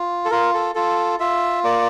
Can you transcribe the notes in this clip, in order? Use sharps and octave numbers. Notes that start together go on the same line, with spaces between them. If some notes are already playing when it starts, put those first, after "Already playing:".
Already playing: F4
A4
F4 A#4
A4
F4 A4
F4 E5
A#3 D5